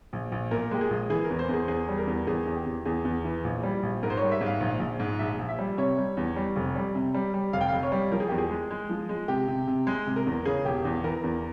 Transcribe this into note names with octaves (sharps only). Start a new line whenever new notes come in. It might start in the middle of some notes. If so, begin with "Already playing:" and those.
A#1
A#1
A#2 A#4
G#3 G4
G#4
A#1
E3 G#4
A#4
E2
C5
E2 G#4
E2 G#4
G3
A#4
E2
E2 G#4
E2
G4
E2
E2 G#4
E2
E3
A#1
G3
A#1
G#2 A#4
C5
G3 C#5
E5
G#2
F5
A#1
A#1
G#2
A#1 E5
A#1
E5
G3
C3 C#5
G3
E2
G3
F1
G3
C3
G3
G3
F1 F5
G5
F1 F5
C#5
G3
F3 A#4
G#4
E2 G4
G#4
G#3
G#3
F3
G#3
C3 G4
C3
C3
G#3 G#4
C3
A#4
E2
C#3 G#4
E1 G4
E2
E3 A#4
E2